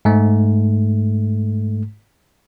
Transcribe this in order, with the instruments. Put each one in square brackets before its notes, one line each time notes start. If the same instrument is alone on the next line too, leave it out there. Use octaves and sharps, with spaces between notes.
[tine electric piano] G#2 A3